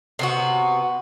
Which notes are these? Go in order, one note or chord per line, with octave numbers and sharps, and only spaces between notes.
C3 B3 F#4